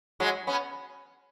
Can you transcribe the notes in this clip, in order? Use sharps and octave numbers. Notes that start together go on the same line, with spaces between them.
F#3 G#3
B3 C#4